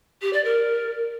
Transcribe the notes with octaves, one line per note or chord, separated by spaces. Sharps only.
G4
D5
A#4